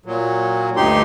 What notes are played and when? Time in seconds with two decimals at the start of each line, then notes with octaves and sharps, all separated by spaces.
0.06 A#2 F#3
0.77 D2 G2 D#4 G4 C6